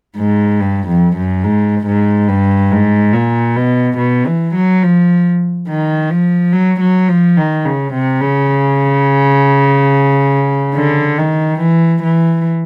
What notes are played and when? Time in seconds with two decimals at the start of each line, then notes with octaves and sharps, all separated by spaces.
0.17 G#2
0.60 G2
0.88 F2
1.16 F#2
1.44 G#2
1.87 G#2
2.29 G2
2.71 G#2
3.13 A#2
3.56 B2
3.98 B2
4.26 E3
4.55 F#3
4.83 F3
5.68 D#3
6.10 F3
6.53 F#3
6.80 F#3
7.08 F3
7.37 D#3
7.65 C#3
7.94 C3
8.21 C#3
10.75 D3
11.18 D#3
11.60 E3
12.03 E3